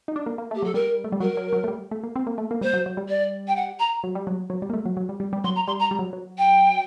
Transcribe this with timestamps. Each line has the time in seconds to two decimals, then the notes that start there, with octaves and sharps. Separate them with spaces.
0.08 D#4
0.16 D4
0.26 A#3
0.38 A#3
0.51 A3
0.55 G4
0.62 F#3 A4
0.74 G3 A#4
1.04 A3
1.12 G3
1.20 F#3 A#4
1.37 F#3
1.53 F#3
1.64 A3
1.68 G3
1.91 A3
2.03 A#3
2.16 C4
2.27 A#3
2.38 A3
2.51 A#3
2.61 G3 C5
2.73 F#3
2.86 F#3
2.97 G3
3.08 D5
3.48 G5
3.56 F#5
3.79 A#5
4.04 F#3
4.15 G3
4.27 F#3
4.50 F#3
4.62 G3
4.70 A#3
4.73 A3
4.86 F#3
4.97 F#3
5.09 G3
5.20 G3
5.33 G3
5.44 F#3 C6
5.55 A#5
5.67 G3 C6
5.79 A#5
5.91 G3
5.99 F#3
6.13 F#3
6.38 G5